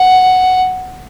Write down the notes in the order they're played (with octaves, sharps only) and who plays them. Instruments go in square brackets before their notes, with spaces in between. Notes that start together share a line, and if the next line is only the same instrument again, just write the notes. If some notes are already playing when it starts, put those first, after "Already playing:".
Already playing: [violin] F#5